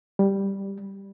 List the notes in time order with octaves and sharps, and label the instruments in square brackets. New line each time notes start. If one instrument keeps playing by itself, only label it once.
[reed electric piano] G3